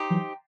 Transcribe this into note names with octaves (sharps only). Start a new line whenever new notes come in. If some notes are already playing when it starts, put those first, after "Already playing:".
Already playing: D#4 G4 C5
E3 F#3